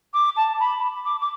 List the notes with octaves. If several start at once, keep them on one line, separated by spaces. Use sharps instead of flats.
D6
A5
B5
D6
D6